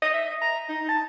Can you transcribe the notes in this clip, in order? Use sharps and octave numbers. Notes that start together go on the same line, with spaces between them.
D#5
E5
A#5
D#4
A5